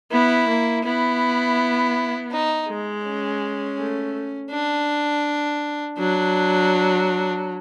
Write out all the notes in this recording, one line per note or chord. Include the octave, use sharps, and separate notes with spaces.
B3 E4
A#3
B3 E4
D#4
G#3
C#4
A3
D4
F#3 D4